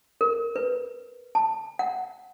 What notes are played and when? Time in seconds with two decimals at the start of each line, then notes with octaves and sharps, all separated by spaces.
0.21 A#4
0.56 B4
1.35 A5
1.79 F#5